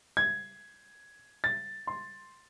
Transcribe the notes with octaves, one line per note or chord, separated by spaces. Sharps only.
G#6
A6
C6